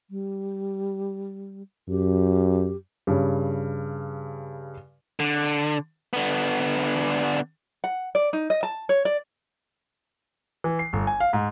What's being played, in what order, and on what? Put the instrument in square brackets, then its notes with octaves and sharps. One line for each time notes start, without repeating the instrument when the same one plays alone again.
[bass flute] G3
[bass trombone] F#2 [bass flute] G4
[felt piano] G2 C#3
[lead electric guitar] D3
D3 B3
[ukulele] F#5
D5
D#4
D#5
A5
C#5
D5
[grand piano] E3
C7
G1
G#5
F5
G#2